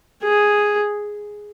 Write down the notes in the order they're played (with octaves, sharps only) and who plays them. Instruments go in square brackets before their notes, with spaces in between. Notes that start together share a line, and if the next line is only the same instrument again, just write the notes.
[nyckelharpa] G#4